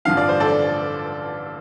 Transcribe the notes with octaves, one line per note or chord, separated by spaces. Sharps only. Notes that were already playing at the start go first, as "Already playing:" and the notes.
A1 G2 D3 F3 F5
D5
C5
A4 D5